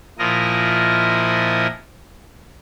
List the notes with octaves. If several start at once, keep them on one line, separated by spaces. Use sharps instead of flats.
A#2 F3 E4 A#4 D#5